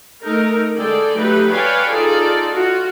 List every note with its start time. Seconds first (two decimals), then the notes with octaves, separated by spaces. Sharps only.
0.23 A3 D#4 A#4
0.78 D3 G#3 G#4 A4 D5 G5
1.17 F#3 A3 D#4 G4 B4
1.51 B4 C#5 D5 F5 G5 G#5
1.90 D#4 F4 G#4 A4 D5
2.53 F4 F#4